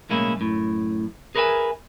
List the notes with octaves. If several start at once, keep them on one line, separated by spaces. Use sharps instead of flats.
B1 A2 G#3 A#3 C#4 E4
F#2 A2
G#4 A#4 B4 C#5 E5 G#5